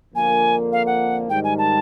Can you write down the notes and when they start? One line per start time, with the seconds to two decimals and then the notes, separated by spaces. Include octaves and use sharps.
0.14 F2 D3 F3 A#3 G#5
0.72 F5
0.86 F#5
1.29 G#2 D#3 G3 G5
1.44 G#5
1.58 A5